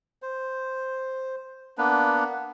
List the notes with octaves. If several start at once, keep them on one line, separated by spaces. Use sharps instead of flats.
C5
A#3 B3 D4 B4